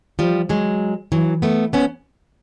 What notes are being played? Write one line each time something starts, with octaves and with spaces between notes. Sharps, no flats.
F3 G3
F#3 G#3
E3 F#3
A3 B3
B3 C#4